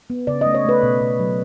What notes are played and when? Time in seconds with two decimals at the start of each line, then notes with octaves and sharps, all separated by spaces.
0.10 B3
0.27 C#3 D5
0.41 D#5
0.46 A3
0.55 C#5
0.65 A3 B4
0.83 B2
1.01 B2
1.19 F#3